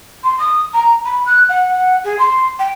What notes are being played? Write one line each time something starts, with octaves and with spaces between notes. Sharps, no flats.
C6
D#6
A#5
B5
F#6
F#5
G#4
C6
G5